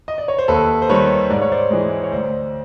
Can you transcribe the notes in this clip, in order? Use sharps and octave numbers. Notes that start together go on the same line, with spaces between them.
D#5
D5
C#5
C5
D#2 A4 B4
C5
D#3 G3 B4 C#5
G#2 D5
C#5
C5 D5
E3 G#3
C#5
D2 C5 D5